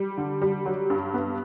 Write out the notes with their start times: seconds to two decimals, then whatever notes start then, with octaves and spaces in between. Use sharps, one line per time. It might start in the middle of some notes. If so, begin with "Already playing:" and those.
Already playing: G3
0.18 D3
0.42 G3
0.66 F#3
0.90 G2
1.14 B3